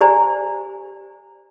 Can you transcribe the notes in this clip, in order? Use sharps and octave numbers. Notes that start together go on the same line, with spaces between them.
G4 C5 D5 G#5 A#5